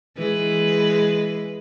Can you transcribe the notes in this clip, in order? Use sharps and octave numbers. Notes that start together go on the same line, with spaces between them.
E3 G#3 B4